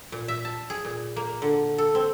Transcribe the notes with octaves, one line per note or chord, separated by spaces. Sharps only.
A#2
E5
A5
G#4
A#2
A#3
D3
A4
C4